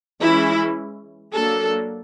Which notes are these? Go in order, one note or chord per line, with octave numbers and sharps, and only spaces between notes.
E3 G#3 C#4 E4
F#3 A#3 D4 A4